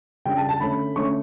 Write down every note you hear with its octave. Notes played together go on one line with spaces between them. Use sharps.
C#3 G3 D4 G5
A5
A5
D3 A3 C#4 B5
D3 A3 C#4 C#6